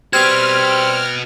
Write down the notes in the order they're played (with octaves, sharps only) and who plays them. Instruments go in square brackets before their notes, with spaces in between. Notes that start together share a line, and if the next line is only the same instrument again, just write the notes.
[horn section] G3 C4 [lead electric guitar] F#4 B4 [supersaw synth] F6 [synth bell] G#6